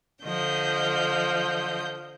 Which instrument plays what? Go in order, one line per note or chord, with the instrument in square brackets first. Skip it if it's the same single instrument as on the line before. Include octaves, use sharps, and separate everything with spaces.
[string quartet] D3 F3 D#5 G6